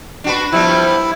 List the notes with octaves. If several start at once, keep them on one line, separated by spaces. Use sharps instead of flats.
D4 F#4 B4
F3 G3 B3 E4